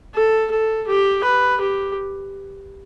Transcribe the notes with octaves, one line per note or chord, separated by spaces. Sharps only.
A4
A4
G4
B4
G4